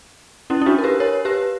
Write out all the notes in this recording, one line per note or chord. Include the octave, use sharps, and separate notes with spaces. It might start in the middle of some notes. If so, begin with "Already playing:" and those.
C#4 E4
E4
D4 F#4
A#4
G4 B4
A#4 C#5
G4 B4